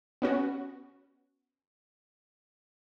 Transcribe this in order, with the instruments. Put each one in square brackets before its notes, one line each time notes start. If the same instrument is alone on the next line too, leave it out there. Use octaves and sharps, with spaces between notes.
[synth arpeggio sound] B3 C#4 F#4